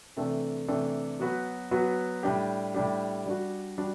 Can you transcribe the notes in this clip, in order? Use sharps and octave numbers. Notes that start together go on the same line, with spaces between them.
C3 E3 A3 D4 A4
C3 E3 A3 D4 A4
F#3 B3 F#4 B4
F#3 B3 F#4 B4
A2 G3 D4 G4
A2 G3 D4 G4
G3 D4 F#4
G3 D4 F#4